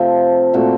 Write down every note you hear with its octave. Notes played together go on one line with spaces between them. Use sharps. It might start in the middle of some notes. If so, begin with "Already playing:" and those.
Already playing: C3 F3 A3 C4 F4
A#2 A3 C4 F#4